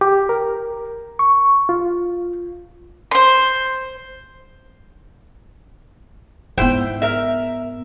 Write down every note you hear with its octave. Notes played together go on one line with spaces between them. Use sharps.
G4
A#4
C#6
F4
C5 C6
G#2 B3 E4 C5 G5
A#4 E5